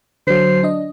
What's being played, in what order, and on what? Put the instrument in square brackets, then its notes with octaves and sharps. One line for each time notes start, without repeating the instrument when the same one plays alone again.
[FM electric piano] D3 F#3 [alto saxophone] C5
[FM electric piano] D4 D#5